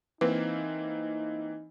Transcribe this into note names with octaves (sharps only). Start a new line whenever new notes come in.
E3 A#3 C4 D#4 B4